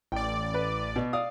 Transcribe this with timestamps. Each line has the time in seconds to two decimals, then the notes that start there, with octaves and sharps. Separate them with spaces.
0.12 A1 D5 G5
0.54 B4
0.96 B2
1.13 D5 F5 D#6